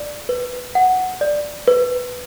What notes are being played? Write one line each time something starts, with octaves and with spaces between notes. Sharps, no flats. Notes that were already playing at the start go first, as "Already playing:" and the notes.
Already playing: D5
B4
F#5
D5
B4